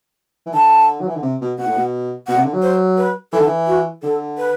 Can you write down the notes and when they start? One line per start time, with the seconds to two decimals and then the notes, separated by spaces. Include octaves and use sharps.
0.46 E3
0.53 D3 A5
1.01 F#3
1.08 E3
1.15 D3
1.23 C3
1.41 B2
1.58 B2 F#5
1.67 A2
1.77 B2
2.27 B2 F#5
2.36 C3
2.45 D3
2.54 F#3
2.62 C5
2.97 B4
3.33 E3 A4
3.40 D3
3.47 E3
3.67 F#4
4.02 D3 A4
4.38 B4